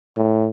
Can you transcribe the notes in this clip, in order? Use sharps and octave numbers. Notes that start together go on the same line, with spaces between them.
A2